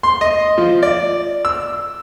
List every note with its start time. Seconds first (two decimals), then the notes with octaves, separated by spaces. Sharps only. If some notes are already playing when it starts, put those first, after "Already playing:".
0.03 C6
0.21 D#5
0.58 F3
0.83 D5
1.45 E6